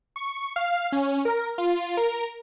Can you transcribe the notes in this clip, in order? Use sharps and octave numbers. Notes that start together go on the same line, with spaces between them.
C#6
F5
C#4
A#4
F4
A#4